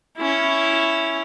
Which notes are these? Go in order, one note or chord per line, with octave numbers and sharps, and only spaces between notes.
C#4 E4